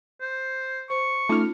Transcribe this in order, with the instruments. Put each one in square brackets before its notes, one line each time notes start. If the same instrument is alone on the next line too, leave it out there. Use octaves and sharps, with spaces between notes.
[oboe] C5
[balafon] C5 [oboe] C#6
[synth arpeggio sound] A3 F6 [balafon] C#4 D#4 F4